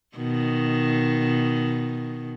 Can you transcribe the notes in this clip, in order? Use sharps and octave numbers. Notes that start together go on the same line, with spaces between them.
B2 D#3